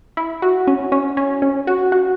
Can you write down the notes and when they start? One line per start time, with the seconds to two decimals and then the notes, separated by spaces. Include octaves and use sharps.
0.17 E4
0.42 F#4
0.67 C#4
0.92 C#4
1.17 C#4
1.42 C#4
1.67 F#4
1.92 F#4